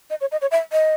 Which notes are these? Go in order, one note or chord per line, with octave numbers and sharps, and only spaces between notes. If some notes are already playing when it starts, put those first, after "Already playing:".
D#5
C#5
D#5
C#5
E5
D#5